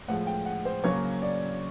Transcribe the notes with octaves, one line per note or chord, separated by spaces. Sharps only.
A2 F3 G#3 F#5
G5
F#5
C5
C#3 F#3 A#3 C#5
D5